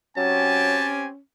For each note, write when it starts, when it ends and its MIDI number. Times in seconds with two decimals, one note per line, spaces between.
0.17 0.87 54
0.17 1.08 60
0.17 1.18 61
0.17 1.08 67
0.17 1.08 80
0.17 0.89 81